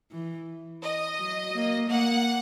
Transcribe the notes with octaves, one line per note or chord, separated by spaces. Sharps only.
E3
D#5
F#3
A#3
A#3 F#5